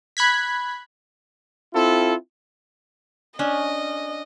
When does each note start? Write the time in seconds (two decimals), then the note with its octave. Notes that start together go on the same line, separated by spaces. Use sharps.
0.17 B5 F#6 G#6 B6
1.74 C4 E4 F4 A4
3.39 C#4 D4 D#5